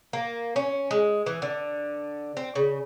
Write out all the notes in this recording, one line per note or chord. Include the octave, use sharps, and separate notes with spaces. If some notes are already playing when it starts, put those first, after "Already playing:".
A#3
C#4
G#3
E3
D3
C4
C#3